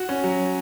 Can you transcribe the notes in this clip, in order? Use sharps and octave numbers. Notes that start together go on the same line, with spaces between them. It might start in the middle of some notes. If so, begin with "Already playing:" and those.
Already playing: F#4
C#4
F#3